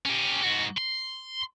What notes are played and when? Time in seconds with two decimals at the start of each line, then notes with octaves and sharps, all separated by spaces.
0.06 C#4 G4
0.43 G#2 F#4
0.78 C6